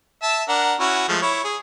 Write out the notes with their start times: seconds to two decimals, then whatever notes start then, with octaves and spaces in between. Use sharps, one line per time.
0.23 E5 A5
0.49 D4 A#4 F#5
0.80 C#4 E4 F#4
1.08 F3 G#3 A3
1.22 E4 C#5
1.44 G#4